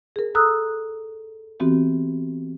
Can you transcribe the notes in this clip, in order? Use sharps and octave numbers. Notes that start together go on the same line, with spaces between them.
G#4 A#4
A4 A#5 D#6 E6 F#6
E3 B3 C4 F#4 G4